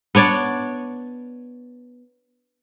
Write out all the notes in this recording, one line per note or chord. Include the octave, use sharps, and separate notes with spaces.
B3 D4 C#5 D5